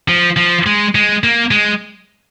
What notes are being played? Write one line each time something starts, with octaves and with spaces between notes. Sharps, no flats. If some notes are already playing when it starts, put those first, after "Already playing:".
F3
F3
G#3
G#3
A#3
G#3